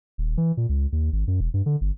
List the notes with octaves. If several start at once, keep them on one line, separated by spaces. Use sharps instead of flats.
D#1
E3
A#2
C#2
D#2
G#1
F#2
E1
G2
D3
G1